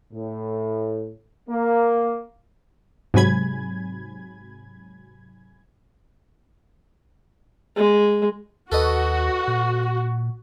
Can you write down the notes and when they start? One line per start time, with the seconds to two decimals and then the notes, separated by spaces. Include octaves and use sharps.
0.13 A2
1.49 A#3
3.14 G#2 C3 F#3 G#5 B5 G#6
7.76 G#3
8.72 D#2 F#4 A4 B4 D#5
9.48 A#2